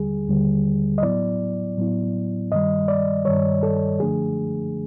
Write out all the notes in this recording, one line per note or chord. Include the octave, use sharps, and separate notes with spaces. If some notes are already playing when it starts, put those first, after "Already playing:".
Already playing: D#2 D3 G3 G#4
D#2 D3 G3
D#5
A2 F#3 B3 E4 D5
A2 F#3 B3 E4
G2 D#3 G3 D#5
D5
G2 D#3 G3 C#5
A4
F#2 D3 F3 A3 D4 G#4